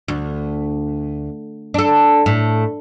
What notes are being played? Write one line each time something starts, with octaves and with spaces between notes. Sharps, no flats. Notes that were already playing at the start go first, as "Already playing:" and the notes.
D2
D4 A4
A2